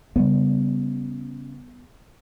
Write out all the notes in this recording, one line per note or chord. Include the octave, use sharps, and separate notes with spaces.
C#3 G3 G#3 B3